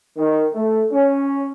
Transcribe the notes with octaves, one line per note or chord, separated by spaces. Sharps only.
D#3
A3
C#4